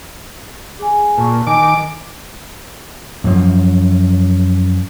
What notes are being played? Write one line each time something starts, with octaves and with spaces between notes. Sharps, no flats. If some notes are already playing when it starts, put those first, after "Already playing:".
G#4 G#5
A#2 A5 C#6
D#3 G#5 D6 D7
F#2 F3